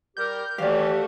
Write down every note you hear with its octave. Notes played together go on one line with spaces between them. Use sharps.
G3 G4 A#4 G6
D#2 D#3 E3 A3 F#4 G4 D5 F5